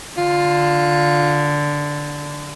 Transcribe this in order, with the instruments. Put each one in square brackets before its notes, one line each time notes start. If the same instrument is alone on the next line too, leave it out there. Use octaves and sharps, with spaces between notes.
[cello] D3 [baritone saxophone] F4